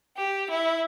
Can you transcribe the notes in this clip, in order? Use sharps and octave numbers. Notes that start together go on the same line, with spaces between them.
G4
E4